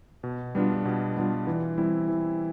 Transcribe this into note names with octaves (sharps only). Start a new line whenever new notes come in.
B2
G3 B3 D4 F4
B2
G3 B3 D4 F4
E3
G3 C4 E4
E3